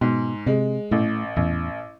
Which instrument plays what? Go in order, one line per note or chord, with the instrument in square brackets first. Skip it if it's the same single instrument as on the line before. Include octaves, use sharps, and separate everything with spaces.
[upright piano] G#2 [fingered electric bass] B2
[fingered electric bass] C3 [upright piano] G#3
[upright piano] A1 [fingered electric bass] A2
[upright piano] A1 [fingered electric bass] E2